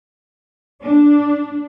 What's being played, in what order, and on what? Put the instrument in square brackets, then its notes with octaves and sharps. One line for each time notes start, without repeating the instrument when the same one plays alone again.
[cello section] D4